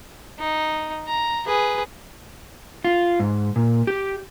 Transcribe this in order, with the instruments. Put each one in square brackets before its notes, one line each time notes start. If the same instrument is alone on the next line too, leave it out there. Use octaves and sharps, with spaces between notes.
[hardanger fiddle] D#4
A#5
G#4 B4
[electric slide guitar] F4
G#2
A#2
G4